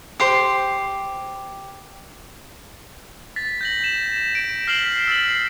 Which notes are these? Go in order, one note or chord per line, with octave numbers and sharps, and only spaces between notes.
G4 C5 C6
A6 B6
G6 A#6 F#7
E7
D7
F6 B6 C7 E7 F#7 G7
E6 A6 F#7